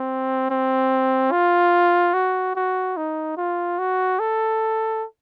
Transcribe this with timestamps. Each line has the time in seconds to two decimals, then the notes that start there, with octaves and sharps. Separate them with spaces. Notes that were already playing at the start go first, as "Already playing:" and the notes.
Already playing: C4
0.50 C4
1.32 F4
2.13 F#4
2.56 F#4
2.97 D#4
3.37 F4
3.78 F#4
4.19 A4